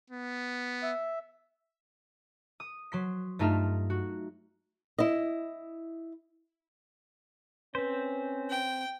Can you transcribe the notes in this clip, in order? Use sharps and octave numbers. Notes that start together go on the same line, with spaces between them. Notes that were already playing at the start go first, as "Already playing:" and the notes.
B3
E5
D#6
F#3 C6 B6
G2 A3 D#4 F4 E5 F6
F#4
E4 D#5
C4 C#4 B4 C5 B6
G5